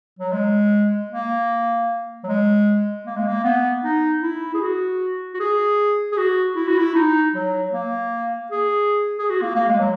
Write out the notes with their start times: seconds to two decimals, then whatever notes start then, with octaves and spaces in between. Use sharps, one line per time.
0.19 F#3
0.33 G#3
1.11 A#3
2.24 F#3
2.27 G#3
3.06 A#3
3.16 G#3
3.27 A#3
3.44 B3
3.84 D#4
4.22 E4
4.54 G#4
4.62 F#4
5.34 F#4
5.40 G#4
6.12 G#4
6.17 F#4
6.56 E4
6.68 F#4
6.78 E4
6.95 D#4
7.34 F#3
7.73 A#3
8.51 G#4
9.19 G#4
9.30 F#4
9.42 A#3
9.55 A#3
9.68 G#3
9.79 F#3